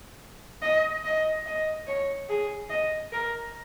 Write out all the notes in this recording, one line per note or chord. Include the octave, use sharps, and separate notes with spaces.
D#5
D#5
D#5
C#5
G#4
D#5
A#4